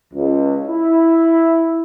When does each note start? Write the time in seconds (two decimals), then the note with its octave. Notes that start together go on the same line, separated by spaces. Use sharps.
0.14 C#2
0.67 E4